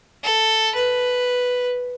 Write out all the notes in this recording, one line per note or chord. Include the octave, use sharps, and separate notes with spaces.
A4
B4